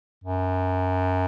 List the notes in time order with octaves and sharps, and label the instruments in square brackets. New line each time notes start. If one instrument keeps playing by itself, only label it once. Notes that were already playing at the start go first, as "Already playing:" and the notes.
[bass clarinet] F#2